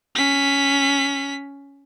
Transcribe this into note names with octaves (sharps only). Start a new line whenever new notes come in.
C#4 B6